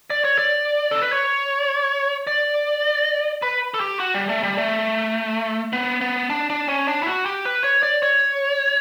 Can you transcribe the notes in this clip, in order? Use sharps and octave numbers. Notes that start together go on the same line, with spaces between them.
D5
C#5
D5
A4
B4
C#5
D5
B4
A4
G4
F#4
G3
A3
G3
A3
B3
B3
D4
D4
C#4
D4
E4
F#4
G4
B4
C#5
D5
C#5